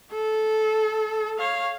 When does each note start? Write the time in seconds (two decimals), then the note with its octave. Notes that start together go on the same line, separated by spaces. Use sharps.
0.12 A4
1.39 C#5 F5